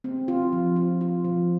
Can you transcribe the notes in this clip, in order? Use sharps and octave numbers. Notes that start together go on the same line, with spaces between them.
C4
F4
F3
F4
F4
F3